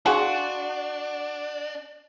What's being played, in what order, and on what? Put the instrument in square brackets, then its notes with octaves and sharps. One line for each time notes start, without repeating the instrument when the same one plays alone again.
[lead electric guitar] D4 [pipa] F#4 [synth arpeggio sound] G#4 F#5 G#5 [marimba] F5 C6 C#6